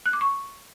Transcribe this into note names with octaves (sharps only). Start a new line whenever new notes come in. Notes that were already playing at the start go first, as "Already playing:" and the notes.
F#6
D6
C#6